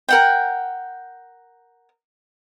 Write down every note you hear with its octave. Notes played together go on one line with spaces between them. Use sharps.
A#4 F#5 G5